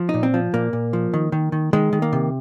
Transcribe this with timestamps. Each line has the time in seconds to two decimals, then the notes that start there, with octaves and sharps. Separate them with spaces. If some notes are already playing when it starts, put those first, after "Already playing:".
Already playing: F3
0.09 A#2 D#4
0.23 C4
0.34 F3
0.54 A#2 A#3
0.73 A#2
0.93 F3
1.14 D#3
1.32 D#3
1.52 D#3
1.73 D#3 G#3
1.93 D#3
2.02 A#3
2.13 C3